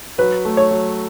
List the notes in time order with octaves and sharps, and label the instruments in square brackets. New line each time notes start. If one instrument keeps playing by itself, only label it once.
[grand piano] F#3 [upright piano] B4
[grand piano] A3
[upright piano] C#5
[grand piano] F#3